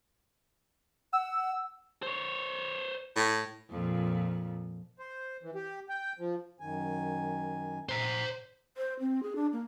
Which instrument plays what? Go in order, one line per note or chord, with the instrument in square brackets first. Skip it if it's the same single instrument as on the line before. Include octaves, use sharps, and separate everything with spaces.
[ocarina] F#5 [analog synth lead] E6
[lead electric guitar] C5 C#5
[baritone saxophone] A2
[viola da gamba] F2 A#2
[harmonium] C5
E3
G4
G5
F3
F#2 D#3 G#5
[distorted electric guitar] C5 A#5
[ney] C5
C4
G#4
D4
A#3